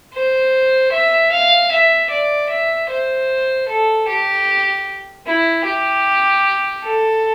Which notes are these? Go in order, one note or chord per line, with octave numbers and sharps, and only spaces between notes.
C5
E5
F5
E5
D5
E5
C5
A4
G4
E4
G4
A4